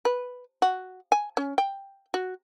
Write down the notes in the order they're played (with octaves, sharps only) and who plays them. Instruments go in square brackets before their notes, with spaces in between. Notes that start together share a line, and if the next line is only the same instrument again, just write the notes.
[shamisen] B4
F#4
G#5
C#4
G5
F#4